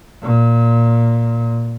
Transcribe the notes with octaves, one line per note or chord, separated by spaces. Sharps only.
A#2